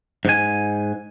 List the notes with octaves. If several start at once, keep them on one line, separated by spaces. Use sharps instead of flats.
G#2 G#5